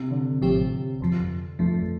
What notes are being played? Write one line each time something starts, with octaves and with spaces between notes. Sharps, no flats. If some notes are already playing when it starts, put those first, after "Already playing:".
Already playing: C3
D3
A1 A2 F3 C4 G4
G1 F2 F3
G1 F2 F3 A3